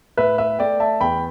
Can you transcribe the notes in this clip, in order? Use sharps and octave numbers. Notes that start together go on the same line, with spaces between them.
A2 B4 E5
B4 E5
A3 D5 G5
E5 A5
E2 G5 B5